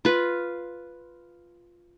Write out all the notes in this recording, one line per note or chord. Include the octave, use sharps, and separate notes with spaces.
F4 B4